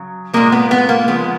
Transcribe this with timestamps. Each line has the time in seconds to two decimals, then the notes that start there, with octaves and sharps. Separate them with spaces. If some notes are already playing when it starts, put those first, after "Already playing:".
Already playing: C#3 F#3
0.33 A#2 F3 G#3 A#3
0.52 B3
0.71 B3
0.89 A#3
1.08 C#3 F3 G#3 B3